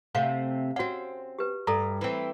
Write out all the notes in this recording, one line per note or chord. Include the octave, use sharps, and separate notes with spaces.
C3 A3 C4 F5 F#5
C4 C#4 F#4 F#5
G4 B4
G2 A4 A#5
E3 C4